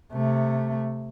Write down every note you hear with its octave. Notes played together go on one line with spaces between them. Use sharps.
C3 A3